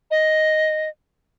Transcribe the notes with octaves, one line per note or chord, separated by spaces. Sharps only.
D#5